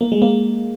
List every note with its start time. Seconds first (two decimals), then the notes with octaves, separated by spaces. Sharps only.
0.01 A#3
0.12 G#3
0.22 A#3